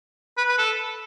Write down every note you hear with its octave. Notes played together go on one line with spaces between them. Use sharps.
B4
B4
A4